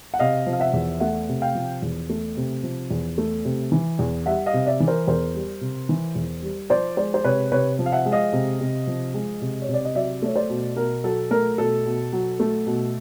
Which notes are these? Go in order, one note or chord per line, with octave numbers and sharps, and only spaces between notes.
F#5
C3 D#5 F5
F3
F5
E5 F#5
E2
A3 E5 F#5
C3
F5 G5
F3
E2
A3
C3
F3
E2
A3
C3
E3
E2
G3 E5 F#5
D#5 F5
C3
D5 E5
E3
A#4 C5
E2 A#4 C5
G3
C3
E3
E2
G3
F3 C5 D5
G#3 C5 D5
C5
C3 B4 C#5
C3 B4 C#5
F3
F5
E5 F#5
G#3
D#5 F5
C3
C3
F3
G#3
C3
C#5
C3
D5
D#5
F#3 D5 E5
A3 C#5
C5 D5
B2
B2 A#4
F#3 A4
A3 A#4
B2 A4
B2
F#3
A3
B2